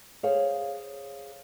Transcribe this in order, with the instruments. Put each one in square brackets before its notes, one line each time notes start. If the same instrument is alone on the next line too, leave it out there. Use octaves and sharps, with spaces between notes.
[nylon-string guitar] G#4 C5 C#5 F5